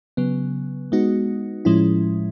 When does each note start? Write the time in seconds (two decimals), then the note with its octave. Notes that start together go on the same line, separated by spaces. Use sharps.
0.17 C#3 F#3 B3
0.92 G#3 B3 D#4 F#4
1.65 A2 F3 G#3 C#4 E4